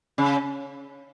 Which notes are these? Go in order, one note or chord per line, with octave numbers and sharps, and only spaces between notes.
C#3